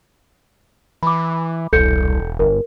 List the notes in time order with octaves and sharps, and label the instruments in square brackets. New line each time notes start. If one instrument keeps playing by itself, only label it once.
[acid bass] E3 [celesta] B5 D6
[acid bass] E1 [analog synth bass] C2 [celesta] A4 G6 C#7
[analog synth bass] G1 [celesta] A#4